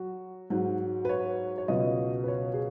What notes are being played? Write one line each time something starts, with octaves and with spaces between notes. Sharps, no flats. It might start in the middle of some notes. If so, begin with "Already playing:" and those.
Already playing: F#3 F#4
G#2 F#3
B4
C#5
C#5
C#2 B2 F#3 D#5
B4
C#5
G#4